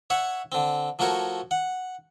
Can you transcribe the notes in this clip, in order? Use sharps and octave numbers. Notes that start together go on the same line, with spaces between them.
C#5 E5 F#5
D3 C4
F3 A3 F#4 A#4 C#5
F#5